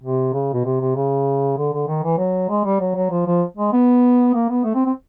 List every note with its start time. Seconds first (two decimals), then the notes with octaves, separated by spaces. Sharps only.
0.03 C3
0.33 C#3
0.53 B2
0.65 C3
0.80 C3
0.96 C#3
1.57 D3
1.73 D3
1.88 D#3
2.03 E3
2.18 F#3
2.49 G#3
2.65 G3
2.80 F#3
2.95 F#3
3.11 F3
3.26 F3
3.57 G#3
3.73 B3
4.34 A#3
4.50 B3
4.64 A3
4.75 C4
4.86 C4